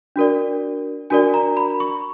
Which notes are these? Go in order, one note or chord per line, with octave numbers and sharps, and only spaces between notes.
D4 F#4 A#4 D5
D4 F#4 A#4 D5 G#5
A#5
B5
C#6